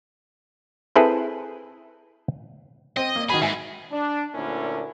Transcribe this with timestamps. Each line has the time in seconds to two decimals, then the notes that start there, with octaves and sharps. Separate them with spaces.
0.96 C4 E4 G#4 A4 B4
2.97 C4 D#5
3.16 A#3
3.30 D#3 F#4 G#4 B5
3.42 G#2 E5 G#5
3.91 D4
4.34 D2 A#2 C#4 D4 E4 A#4